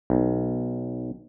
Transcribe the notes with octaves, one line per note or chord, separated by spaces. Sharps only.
B1